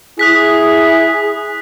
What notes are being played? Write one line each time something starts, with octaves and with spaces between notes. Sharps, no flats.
E4 G#4 D#6 F#6 B6